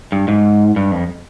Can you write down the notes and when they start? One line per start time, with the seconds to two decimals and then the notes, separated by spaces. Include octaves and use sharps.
0.12 G2
0.28 G#2
0.76 G2
0.92 F2